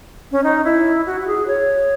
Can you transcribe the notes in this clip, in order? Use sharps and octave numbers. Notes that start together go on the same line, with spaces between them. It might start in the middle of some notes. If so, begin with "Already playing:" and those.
C#4
D#4
E4
F#4
F#4
G#4
C#5